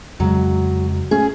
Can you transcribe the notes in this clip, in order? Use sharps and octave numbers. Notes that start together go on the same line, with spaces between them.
F2 C#3 F#3 G#3
A3 C#4 G#4